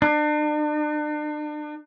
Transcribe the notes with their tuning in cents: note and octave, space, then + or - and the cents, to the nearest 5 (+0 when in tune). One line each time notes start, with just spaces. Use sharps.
D4 +40